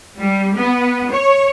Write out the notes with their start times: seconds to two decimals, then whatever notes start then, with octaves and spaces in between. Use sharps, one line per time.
0.18 G3
0.55 B3
1.12 C#5